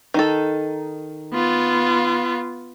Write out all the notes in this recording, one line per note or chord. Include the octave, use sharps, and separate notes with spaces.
D#3 D#4 A4
B3 F4